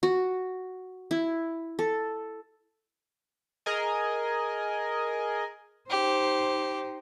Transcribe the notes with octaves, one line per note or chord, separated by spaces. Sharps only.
F#4
E4
A4
G#4 A#4 D#5 G#5
D#4 G4 C5